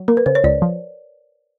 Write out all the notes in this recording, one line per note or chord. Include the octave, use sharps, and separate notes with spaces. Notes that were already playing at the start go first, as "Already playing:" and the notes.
Already playing: F#3
A#3 A#4
B4
C#3 C5
C#5
C#2 D5
F3